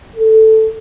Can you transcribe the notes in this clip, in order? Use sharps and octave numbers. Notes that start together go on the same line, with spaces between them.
A4